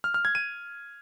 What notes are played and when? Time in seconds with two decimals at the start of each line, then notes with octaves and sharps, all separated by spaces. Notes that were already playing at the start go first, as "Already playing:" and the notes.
0.04 F6
0.14 F6
0.25 G#6
0.35 D#7